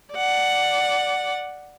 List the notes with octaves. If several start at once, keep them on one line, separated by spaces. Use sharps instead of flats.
D5 F#5